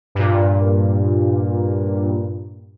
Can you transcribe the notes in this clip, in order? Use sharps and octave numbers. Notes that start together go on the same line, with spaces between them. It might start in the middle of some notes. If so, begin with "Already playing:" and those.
G2 A#2